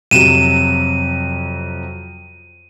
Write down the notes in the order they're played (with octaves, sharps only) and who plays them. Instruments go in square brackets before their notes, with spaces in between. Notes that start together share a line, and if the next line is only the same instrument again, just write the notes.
[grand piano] F2 C3 F#3 [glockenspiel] D#7 E7